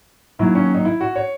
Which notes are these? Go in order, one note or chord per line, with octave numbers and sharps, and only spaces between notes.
D#2 D#3 F#3 E4
C#4
D#4
E4
F#4
C#5